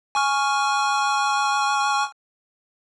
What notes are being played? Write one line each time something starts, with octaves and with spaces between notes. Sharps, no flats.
G#5 C#6 F6